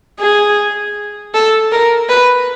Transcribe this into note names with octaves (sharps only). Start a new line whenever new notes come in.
G#4
A4
A#4
B4